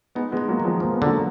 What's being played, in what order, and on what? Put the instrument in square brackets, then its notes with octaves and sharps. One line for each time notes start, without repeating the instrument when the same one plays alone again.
[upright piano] G#3 B3 [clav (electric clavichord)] D#4
[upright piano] G#3 B3
[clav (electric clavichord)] D#4
[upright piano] F#3 A#3
[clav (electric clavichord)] D#3
[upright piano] F3 G#3
[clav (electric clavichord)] F3 [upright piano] A#3
[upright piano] B3
[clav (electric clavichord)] D3 [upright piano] F#3 A#3